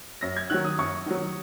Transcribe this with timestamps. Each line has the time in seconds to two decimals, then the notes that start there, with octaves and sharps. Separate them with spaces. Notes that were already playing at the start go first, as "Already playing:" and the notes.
0.21 F#2 A#6
0.37 G#6
0.50 D#3 F#3 F#6
0.64 D#6
0.78 F#2 C#6
1.06 D#3 F#3